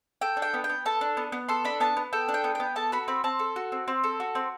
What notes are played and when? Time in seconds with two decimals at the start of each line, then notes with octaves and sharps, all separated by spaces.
0.21 A4 G5
0.37 D4
0.42 G5
0.54 B3
0.64 G5
0.69 B3
0.86 A4 A5
1.01 D4
1.17 B3
1.32 B3
1.49 A4 C6
1.65 D4 B5
1.80 B3 A5
1.97 B3
2.13 A4 G5
2.29 D4
2.34 G5
2.44 B3
2.55 B3 G5
2.76 A4 A5
2.92 F#4 B5
3.08 C4 B5
3.24 C4 A5
3.39 A4
3.56 F#4
3.72 C4
3.88 C4
4.04 A4
4.20 F#4
4.35 C4